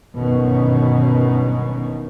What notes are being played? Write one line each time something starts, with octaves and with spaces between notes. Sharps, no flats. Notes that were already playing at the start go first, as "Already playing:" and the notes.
G1 F#2 B2 D#3 B3 C#4